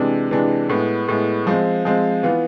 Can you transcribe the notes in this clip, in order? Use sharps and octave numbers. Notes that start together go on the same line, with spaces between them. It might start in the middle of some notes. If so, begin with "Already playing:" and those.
Already playing: C3 E3 G#3 D4
C3 E3 G#3 D4
A2 G#3 B3
A2 G#3 B3
F3 G#3 C4
F3 G#3 C4
E3 B3 F4